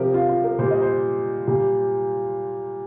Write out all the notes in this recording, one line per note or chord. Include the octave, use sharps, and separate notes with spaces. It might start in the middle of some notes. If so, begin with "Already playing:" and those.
Already playing: C3 F3 G4 A#4
F4
F4
A#4
A#2 G3 C5
D#5
C5
A#2 G3